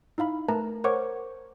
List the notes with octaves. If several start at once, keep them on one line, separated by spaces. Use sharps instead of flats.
D#4 E4 F5 B5
A3 A#4 B4 A5 A#5
A#4 C5 C#5 F#5 C#6 D6